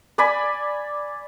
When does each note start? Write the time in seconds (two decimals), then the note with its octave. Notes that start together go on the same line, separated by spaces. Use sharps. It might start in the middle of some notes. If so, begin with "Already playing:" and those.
0.18 D5 G#5 B5